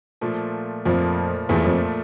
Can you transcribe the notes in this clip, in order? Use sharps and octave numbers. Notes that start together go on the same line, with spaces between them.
A#2 F3 A3
F2 A#2 F3 A3
E2 A#2 F3 A3
F2